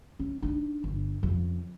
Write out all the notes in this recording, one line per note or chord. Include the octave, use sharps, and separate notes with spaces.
C#4
D4 D#4
G1
F2 C#3